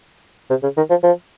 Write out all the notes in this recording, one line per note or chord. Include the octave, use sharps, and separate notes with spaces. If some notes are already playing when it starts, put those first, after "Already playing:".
C3
C#3
D#3
F3
F3